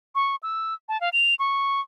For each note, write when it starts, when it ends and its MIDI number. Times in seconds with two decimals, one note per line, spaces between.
0.15 0.36 85
0.43 0.74 88
0.89 1.00 81
1.01 1.09 77
1.13 1.34 101
1.39 1.81 85